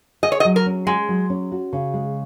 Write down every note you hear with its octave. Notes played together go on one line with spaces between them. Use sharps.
G#4 D#5
C#5
D#5
F#3
A#4
C#4
G#3 G#4
F#3
C#4
F#4
C#3
G#3